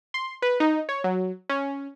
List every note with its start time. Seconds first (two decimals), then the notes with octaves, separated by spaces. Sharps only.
0.14 C6
0.42 B4
0.60 D#4
0.89 C#5
1.04 F#3
1.50 C#4